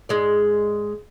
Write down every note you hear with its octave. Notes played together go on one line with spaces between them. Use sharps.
G#2 G#3 D5